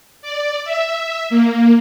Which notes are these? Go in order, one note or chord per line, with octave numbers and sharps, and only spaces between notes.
D5
E5
A#3